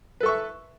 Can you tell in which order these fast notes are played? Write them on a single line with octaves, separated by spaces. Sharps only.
B4 A4 C#6 E5